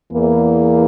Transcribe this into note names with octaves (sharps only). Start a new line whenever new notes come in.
E2 E3 A#3